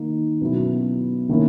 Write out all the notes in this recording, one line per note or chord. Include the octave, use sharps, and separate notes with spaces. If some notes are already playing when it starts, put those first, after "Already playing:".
Already playing: D#3 A#3 D#4
B2 F#3 C#4 E4
D#3 A#3 C#4 E4